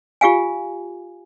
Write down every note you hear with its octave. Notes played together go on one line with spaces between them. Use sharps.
F4 G4 F5 G#5